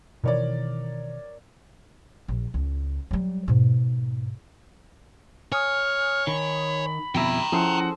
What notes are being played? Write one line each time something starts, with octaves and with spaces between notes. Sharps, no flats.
B2 D#3 E3 A#4 C#5 D5
A#1
C#2
F#3 G3
G#2 B2
C#5 G#5 D#6 F6
D#3 B5
F2 B2 E4 G5 A#5
F3 C#4 E4 G#4 A4 C5 F#5